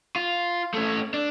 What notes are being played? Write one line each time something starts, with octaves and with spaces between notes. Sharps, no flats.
F4
A3 C#4
D4